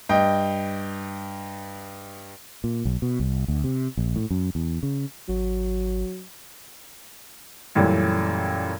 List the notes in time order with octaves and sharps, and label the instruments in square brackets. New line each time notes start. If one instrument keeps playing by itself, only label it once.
[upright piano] G2 D#5 G5
[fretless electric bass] A#2
B1
B2
C2
D2
C3
A#1
A2
F#2
E2
C#3
[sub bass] G#1 [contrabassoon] F#3
[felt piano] F#2 A#2 E3 G3 A3 C#4